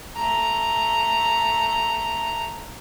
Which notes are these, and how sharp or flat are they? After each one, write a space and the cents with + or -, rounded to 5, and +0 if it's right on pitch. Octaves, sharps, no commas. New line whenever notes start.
A3 +5 A#5 +0